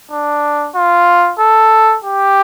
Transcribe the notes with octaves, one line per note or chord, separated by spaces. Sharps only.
D4
F4
A4
G4